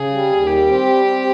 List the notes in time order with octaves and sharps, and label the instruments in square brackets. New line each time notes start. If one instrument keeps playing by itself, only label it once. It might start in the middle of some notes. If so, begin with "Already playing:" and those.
Already playing: [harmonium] C#3 [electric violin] G#4
[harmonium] G3
D#2
[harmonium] G3 [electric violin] G4
[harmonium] C4
G3
C4